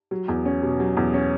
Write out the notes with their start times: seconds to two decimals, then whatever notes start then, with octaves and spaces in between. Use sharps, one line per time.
0.11 F#3
0.28 E2
0.45 C#4
0.63 B2
0.80 F#3
0.97 E2
1.14 C#4